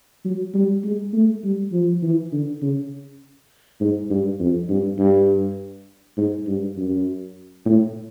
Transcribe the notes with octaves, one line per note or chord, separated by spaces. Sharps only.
F#3
G3
G#3
A3
G3
F3
E3
D3
C#3
G#2
G2
F2
G2
G2
G#2
G2
F#2
A2